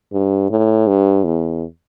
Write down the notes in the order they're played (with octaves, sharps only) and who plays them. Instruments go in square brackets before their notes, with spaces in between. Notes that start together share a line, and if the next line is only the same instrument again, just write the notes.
[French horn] G2
A2
G2
E2